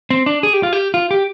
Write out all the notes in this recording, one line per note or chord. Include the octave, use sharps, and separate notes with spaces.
C4
D4
G#4
G4
F4
G4
F4
G4